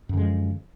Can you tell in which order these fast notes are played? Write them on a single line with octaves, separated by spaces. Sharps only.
F#2 D3 G#3 F3